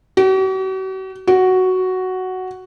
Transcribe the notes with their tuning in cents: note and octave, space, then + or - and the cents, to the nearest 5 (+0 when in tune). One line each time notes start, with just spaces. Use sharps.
F#4 +45
F#4 +5